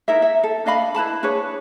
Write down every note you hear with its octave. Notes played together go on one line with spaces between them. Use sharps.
D#4 E4 A#4 E5
E5
A4
D4 D#5 F5 B5
E4 B4 A5 B5
D4 G#4 B4 C#5